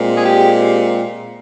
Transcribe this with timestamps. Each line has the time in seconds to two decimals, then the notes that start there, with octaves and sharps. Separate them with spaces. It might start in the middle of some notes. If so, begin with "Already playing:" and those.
Already playing: A#2 G#3 C4
0.15 G#4
0.24 G4